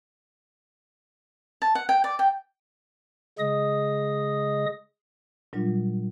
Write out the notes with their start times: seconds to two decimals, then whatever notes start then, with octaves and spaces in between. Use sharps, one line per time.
1.62 A5
1.75 F#5
1.89 G5
2.04 D5
2.19 G5
3.39 C#3 G#3 G#4 D#5 D#6
5.53 A#2 F#3 G3 D4 F4